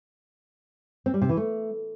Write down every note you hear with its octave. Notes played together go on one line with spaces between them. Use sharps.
C4
G3
C3
E3
A3